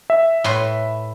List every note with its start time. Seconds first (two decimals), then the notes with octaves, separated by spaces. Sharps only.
0.10 E5
0.44 A2 B4 C6